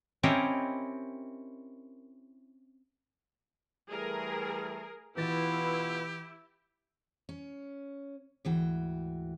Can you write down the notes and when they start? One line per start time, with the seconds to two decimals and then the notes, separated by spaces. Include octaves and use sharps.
0.23 C4 C#4 E4 G4 A#4 D#5
3.90 E3 G3 A3 G#4 A#4
5.17 B2 E3 E4 F4 G4 B4 A6
7.29 C#4
8.45 D2 G#2 E3 F#4 G5